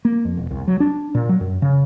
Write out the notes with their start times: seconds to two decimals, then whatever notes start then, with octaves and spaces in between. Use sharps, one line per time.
0.05 A#3
0.25 F2
0.37 E1
0.51 C2
0.67 F#3
0.80 D4
1.15 A#2
1.29 F#3
1.41 F#2
1.62 C#3